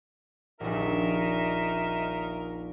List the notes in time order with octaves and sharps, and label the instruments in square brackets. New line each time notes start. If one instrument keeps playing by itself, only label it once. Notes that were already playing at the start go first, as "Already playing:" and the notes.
[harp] D#1 A#1 [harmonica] D#4 A#4 E5